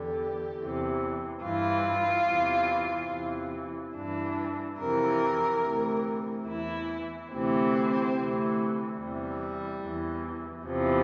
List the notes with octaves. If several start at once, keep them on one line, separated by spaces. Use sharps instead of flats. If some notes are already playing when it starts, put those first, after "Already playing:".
Already playing: E2 D3 G4
E2 C3 E3
G2 E3 F4
E2 C3 E3
E2 C3 E3
G2 E3 D4
F2 C3 E3 A#4
D2 C3 E3
E2 E3 E4
D2 C3 E3 C4
D2 C3 E3
E2 C3 E3 G3
E2 E3
E2 C3 E3 F3